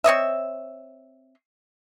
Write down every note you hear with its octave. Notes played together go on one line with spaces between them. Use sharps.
C4 C#5 D#5 E5